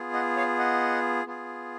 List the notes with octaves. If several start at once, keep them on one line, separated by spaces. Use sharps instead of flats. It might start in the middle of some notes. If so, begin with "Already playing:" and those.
Already playing: B3 F4 G#4
D#5 F#5
C#5 F5
D#5 F#5
B3 F4 G#4